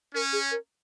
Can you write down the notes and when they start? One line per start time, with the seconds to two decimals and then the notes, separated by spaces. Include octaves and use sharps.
0.14 C#4 A#4
0.33 G#4
0.51 A#4